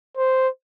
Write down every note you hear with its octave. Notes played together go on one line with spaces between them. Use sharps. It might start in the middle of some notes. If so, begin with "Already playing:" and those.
C5